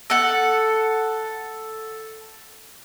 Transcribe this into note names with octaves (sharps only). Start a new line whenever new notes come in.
A4 F#5